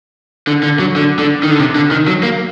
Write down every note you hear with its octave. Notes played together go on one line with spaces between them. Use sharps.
D3
D3
F#3
D3
D3
D#3
D3
C3
D3
D#3
F#3
A#3